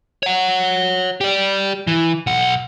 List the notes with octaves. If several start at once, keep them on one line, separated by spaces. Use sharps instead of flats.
C#5 F#5
G4 D5
E3
B1 F#5